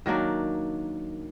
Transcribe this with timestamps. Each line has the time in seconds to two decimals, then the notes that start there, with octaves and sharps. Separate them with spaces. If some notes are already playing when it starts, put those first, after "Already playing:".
0.06 D#3 F#3 A#3 D4